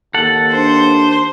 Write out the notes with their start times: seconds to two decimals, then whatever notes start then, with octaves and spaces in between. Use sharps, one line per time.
0.14 D#2 A4 F#5
0.52 D4 C5